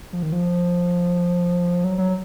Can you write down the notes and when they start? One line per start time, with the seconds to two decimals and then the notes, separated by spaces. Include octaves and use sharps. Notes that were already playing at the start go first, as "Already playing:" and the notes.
0.13 F3
0.23 D#3
0.32 F3
1.84 F#3
1.98 F#3